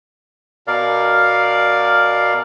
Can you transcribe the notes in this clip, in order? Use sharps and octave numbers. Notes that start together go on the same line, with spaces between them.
B2 A#4 D5 F5